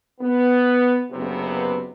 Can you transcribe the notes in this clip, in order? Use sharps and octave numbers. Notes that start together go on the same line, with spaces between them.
B3
F#1 C3 B3